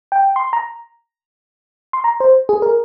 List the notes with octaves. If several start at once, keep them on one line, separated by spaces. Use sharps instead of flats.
G5
C6
A#5
C6
A#5
C5
G#4
A#4